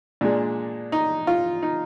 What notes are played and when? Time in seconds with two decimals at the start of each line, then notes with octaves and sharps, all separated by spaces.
0.21 A#2 G#3 D4
0.92 D#4
1.27 F4
1.63 D#4